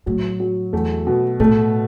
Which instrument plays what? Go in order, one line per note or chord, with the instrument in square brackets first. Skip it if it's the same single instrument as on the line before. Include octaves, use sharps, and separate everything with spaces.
[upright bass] A2 [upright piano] F#3
[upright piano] F#3
[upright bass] E2 [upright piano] A3
[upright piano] B2
[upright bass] A2 [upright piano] A3